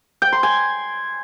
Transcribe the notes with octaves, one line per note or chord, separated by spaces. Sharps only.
G5
C6
G#5